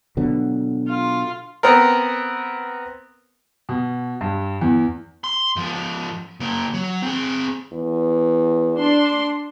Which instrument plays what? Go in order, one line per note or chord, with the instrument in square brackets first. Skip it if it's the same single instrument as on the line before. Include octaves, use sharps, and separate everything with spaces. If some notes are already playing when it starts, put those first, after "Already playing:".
[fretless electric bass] B2 D3 F#3
[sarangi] F4
[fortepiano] B3 C4 A#4
[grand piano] B2
G2
E2
[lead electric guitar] C6
G#2 F3
C#3 A#3
F#3
C4 G#4
[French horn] E2
[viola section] D4 C6